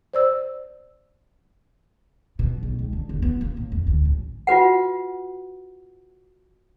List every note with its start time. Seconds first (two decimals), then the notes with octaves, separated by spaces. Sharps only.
0.14 C5 D5 E6
2.39 B2
2.63 B1
2.79 C#2
2.93 D3
3.09 E1
3.22 B3
3.41 A#3
3.57 A2
3.72 F2
3.87 D2
4.05 A1
4.47 F4 F#4 B4 F#5